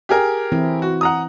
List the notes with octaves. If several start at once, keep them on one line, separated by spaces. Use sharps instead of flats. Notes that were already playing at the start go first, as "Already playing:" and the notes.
G4 G#4 A#4
E3 C4 E4
F#4
F#5 A#5 D#6